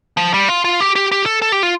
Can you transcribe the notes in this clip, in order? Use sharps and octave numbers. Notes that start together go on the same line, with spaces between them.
F3
G3
F4
F4
G4
G4
G4
A4
A4
G4
F4